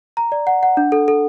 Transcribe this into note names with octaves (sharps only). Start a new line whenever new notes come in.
A#5
D5
F#5
F#5
D4
A4
A4